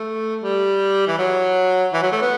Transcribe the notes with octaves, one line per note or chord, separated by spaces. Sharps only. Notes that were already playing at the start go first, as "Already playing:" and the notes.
Already playing: A3
G3
E3
F#3
E3
F#3
A3
B3